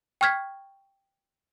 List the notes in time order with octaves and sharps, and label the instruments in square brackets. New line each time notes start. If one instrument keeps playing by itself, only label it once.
[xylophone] G5 C#6 F6 G#6 B6